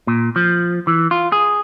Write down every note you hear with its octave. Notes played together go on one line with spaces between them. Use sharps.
A#2
F3
E3
F4
G#4